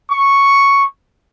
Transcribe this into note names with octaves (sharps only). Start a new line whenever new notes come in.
C#6